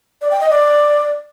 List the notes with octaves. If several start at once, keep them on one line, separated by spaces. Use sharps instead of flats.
D5
G5
D#5
D5